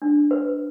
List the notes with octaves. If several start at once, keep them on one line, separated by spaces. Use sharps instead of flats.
D4
B4